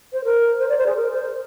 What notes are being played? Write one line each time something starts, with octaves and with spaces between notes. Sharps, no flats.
C5
A#4
C5
D5
C5
G#4
A#4
C5